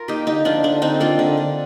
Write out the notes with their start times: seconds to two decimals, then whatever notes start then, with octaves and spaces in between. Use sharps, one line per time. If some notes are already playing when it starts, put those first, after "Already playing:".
Already playing: F4 A#4
0.08 A#3 D#4 G4
0.27 D3 D#4 G4
0.45 F3 D4 F4
0.63 D3 D4
0.82 D3 C4 D#4
1.00 A#3 D4 F4
1.19 D3
1.37 D3